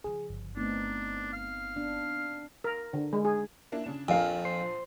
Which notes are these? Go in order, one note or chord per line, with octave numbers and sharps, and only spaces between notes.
C#3 F3 G#4
G1
A3 B3 C4 D4 D#4
F5
B3 D4
A#4
D3
G#3
G#4
A#3 D4 E4
C#3 D4 E7
A#1 F2 F3 D4 A#4 F5 G#5
C5